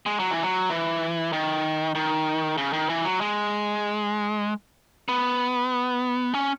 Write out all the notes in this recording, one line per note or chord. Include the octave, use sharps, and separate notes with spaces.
G#3
F#3
E3
F#3
E3
D#3
D#3
C#3
D#3
E3
F#3
G#3
B3
C#4